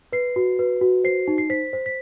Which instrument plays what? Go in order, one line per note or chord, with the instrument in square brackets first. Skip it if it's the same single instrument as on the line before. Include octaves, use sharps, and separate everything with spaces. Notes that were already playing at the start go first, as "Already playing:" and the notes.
[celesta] B4 C7
F#4
B4
F#4
C5 C7
D#4
C7
C5 B6
C5
B6